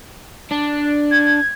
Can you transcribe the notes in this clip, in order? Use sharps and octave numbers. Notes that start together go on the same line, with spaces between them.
D4
G#6